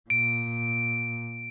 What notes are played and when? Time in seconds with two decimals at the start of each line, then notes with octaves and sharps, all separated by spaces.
0.10 A#2 D7